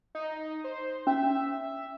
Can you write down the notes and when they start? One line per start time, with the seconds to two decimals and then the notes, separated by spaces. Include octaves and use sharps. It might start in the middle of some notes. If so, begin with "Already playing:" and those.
0.15 D#4
0.64 C5
1.07 C#4 E5